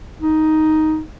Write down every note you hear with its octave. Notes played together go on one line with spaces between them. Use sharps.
D#4